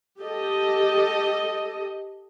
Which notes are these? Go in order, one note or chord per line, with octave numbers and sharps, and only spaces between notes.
G4 A4 D#5